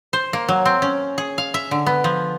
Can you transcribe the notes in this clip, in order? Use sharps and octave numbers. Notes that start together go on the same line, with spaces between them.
C5
A#3
F#3
C4
C#4
G#4
F5
E5
D3
B3
F3